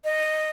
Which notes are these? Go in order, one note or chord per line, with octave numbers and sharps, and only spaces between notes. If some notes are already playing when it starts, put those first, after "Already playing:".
D#5